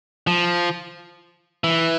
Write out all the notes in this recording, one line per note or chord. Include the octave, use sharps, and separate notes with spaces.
F3
E3